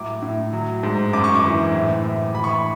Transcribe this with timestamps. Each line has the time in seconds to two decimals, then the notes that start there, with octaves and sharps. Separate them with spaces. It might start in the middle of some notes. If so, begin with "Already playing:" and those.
Already playing: A2 F#3 D6
0.22 A2
0.53 F#3
0.83 G#2
1.13 F#2 D6
1.24 C#6
1.34 D6
1.44 E3
1.74 A2
2.04 A2
2.34 E3 B5
2.44 C#6
2.54 B5